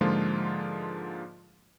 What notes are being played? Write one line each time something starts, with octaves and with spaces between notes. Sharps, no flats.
G#2 D3 F3 G#3 A#3 F4